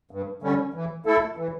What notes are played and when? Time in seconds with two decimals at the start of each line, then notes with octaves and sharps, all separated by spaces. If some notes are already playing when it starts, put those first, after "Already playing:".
0.11 G2
0.42 D3 G3 C#4
0.74 E3
1.06 A3 E4 A4
1.37 E3